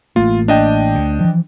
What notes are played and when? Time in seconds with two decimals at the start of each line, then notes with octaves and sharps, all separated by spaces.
0.16 A1 A3 A#3 F4
0.48 D4 D#5 G5
0.95 D2
1.21 E3 F3